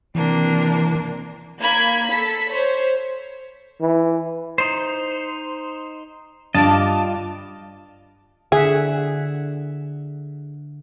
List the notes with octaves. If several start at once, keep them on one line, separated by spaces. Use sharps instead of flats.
C3 E3 A#3 D4
A#3 B5 G#6
A4 B6
C5 C#5
E3
D#4 C5
G2 F4 D#5 A5 D6
D3 G#4 E5 F#5